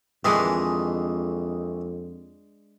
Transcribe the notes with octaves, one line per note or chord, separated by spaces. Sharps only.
F2 D#3 E3 G#3 D4 G#4 B4